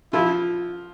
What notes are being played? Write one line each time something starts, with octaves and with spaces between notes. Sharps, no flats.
F3 E4 F4